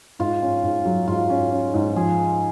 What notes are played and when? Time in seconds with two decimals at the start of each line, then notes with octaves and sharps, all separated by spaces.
0.19 G#2 F4
0.42 C#4
0.63 G#2
0.85 F#3
1.08 G#2 F4
1.30 C#4
1.52 C#4
1.74 G#2
1.96 F3 G#4